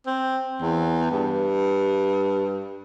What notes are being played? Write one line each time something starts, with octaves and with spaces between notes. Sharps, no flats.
C4
E2
G2